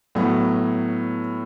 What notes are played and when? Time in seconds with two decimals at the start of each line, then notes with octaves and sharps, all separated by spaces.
0.15 A2 F#3 B3